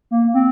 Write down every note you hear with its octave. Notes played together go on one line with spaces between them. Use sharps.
A#3
C4